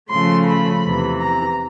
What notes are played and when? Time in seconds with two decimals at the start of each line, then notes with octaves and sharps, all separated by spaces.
0.11 C#3 F3 A3 C#4 C6
0.48 B5
0.84 E2 C3 E3
1.20 A#5